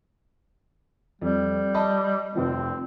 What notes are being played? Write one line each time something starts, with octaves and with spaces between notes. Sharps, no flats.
F2 G3
D#5 A5 B5
F1 F3 C4